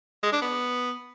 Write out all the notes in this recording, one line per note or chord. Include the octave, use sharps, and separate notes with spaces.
G#3
D4
B3